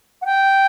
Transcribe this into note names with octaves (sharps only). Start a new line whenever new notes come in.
F#5
G5